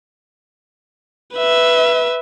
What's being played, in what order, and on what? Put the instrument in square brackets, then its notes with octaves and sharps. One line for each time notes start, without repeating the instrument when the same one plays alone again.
[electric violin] B4 E5